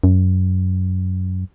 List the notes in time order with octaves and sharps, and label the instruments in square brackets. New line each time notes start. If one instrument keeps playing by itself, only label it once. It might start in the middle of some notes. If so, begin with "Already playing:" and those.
[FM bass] F#2